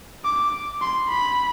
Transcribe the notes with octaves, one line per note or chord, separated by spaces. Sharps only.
D6
C6
B5